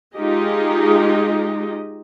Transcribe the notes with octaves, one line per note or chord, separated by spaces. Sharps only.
G#3 D#4 F4 G4 G#4 D#5